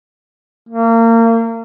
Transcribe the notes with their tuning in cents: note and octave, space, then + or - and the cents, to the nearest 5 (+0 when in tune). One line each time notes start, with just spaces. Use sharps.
A#3 -30